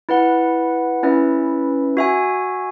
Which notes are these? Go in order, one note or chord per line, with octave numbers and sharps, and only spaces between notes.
E4 B4 F#5
C#4 E4 B4 E5
F#4 E5 G#5